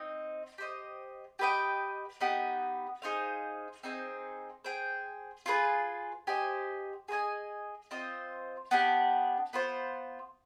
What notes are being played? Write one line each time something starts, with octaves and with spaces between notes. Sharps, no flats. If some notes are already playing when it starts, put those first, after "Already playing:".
Already playing: C4 D#4 D#5
G4 C5 D#5
G4 B4 D#5 G5
B3 D#4 G4
D#4 G#4 C5 F5
C4 D#4 G#4 C5
G#4 C5 G5
F4 G#4 B4
G4 C5 D#5 G#5
G#4 C5 D#5 G#5
C4 F4 C5 D#5
B3 D4 G4
B3 F4 C5